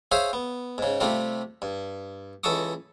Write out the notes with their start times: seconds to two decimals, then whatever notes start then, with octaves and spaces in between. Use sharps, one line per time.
0.11 G#4 C5 C#5 E5 F5 G#5
0.33 B3
0.78 G#2 C#3
1.00 C3 G3 A3 F4
1.62 G2
2.43 C#2 E3 A4 A5 C#6 D#6